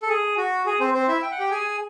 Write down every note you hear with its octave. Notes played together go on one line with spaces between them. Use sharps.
A4
G#4
F#4
G#4
C4 C5
C4 C5
E4 E5
G5
F#5
G4 G5
G#4 G#5